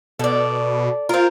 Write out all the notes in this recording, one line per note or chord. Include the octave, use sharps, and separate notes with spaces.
B2 A4 D5
C4 F4 A#4